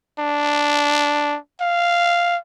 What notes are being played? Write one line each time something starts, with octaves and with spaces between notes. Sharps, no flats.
D4
F5